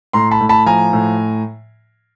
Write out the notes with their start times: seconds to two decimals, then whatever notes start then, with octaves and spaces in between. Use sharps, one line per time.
0.13 A2 A#5 C6
0.31 A5 B5
0.41 A2
0.49 A5 B5
0.66 F3 G#5 A#5
0.93 A2